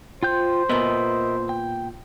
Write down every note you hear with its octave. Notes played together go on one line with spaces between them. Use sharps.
F4 C5 G5 G6
A#2 B3 A#4 D#5 E5
G5